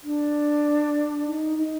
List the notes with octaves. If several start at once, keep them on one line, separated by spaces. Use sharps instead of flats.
D4
D#4
D#4